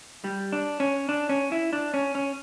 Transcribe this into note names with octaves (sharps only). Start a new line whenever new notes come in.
G3
D4
C#4
D4
C#4
E4
D4
C#4
C#4